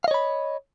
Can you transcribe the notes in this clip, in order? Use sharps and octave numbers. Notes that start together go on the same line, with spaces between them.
C#5 D#5 F5 B5